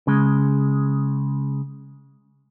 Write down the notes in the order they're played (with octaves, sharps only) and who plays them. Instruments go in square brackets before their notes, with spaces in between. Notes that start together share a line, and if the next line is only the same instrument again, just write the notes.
[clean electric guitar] C#3 G#3